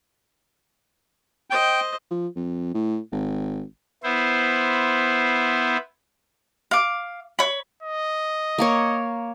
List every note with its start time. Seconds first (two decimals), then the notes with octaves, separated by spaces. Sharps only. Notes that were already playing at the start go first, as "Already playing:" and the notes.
1.50 C5 D#5 G5
2.11 F3
2.36 F2
2.74 A2
3.12 G#1
4.03 B3 E4 C5
6.71 F5 D6
7.39 C#5 B5
7.83 D#5
8.58 A#3 A#4 C#5